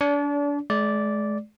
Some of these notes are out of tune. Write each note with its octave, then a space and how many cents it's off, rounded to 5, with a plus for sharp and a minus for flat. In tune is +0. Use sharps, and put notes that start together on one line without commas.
D4 -30 D5 -40
G#3 +40 D5 -10